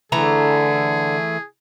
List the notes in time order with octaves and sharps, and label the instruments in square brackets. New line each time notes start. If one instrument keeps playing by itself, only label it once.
[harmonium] D3 [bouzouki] E3 A3 A#5 [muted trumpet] G#4